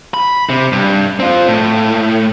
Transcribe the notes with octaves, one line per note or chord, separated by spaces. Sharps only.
B5
C3
G2
C4 F4
A2